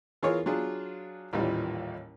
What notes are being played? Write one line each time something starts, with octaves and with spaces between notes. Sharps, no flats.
E3 F4 G#4 A#4 C#5
F#3 D4 F4 G#4
A1 D#2 A#2 E3 G3